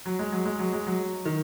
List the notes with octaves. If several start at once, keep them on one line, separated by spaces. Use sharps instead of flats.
F#3
G#3
F#3
G#3
F#3
G#3
F#3
D#3